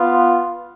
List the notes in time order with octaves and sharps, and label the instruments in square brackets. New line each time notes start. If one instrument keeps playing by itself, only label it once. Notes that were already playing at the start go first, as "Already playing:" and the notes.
Already playing: [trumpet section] B3 F4